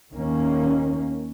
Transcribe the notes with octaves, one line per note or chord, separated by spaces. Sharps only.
D#2 D#3 A#3 C#4